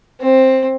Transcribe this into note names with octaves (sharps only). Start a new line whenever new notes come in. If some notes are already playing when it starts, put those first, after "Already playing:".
C4